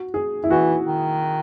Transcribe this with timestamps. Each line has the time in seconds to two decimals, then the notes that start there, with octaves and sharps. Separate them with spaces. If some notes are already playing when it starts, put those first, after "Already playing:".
Already playing: F#4
0.14 G#4
0.44 E4
0.50 E3 F#4
0.85 D#3